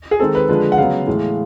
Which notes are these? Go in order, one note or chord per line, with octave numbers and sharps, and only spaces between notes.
G#4
D#3 G#3 C4 A4
B4
D3 F3 G#3
F#5
C#3 F#3 B3 F5
A2 E3 G#3